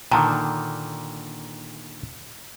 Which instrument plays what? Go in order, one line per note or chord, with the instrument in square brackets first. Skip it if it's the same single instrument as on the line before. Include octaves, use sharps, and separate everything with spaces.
[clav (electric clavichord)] A#2 D3 D#3 [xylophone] G5 A5 A#5